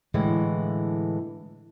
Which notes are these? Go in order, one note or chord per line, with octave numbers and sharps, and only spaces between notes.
A2 D3 E3 G#3